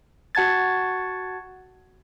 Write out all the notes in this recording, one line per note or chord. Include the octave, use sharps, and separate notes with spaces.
F#4 F#5 A5 G#6 A6